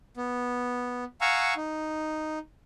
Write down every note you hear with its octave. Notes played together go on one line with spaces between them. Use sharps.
B3
F5 F#5 G#5 A#5 C#6 E6
D#4